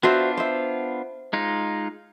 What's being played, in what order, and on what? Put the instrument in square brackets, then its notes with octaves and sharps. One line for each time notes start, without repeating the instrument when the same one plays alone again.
[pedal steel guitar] B3 D4 F4 [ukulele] F#4 C5 E5
[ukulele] C5 E5
[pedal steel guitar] G#3 D#4 F4